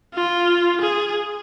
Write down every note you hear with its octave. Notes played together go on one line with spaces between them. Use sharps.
F4
G#4